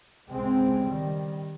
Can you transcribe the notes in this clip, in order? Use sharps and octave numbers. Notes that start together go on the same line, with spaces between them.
C#2 C3 G#3 C4
D#3 G3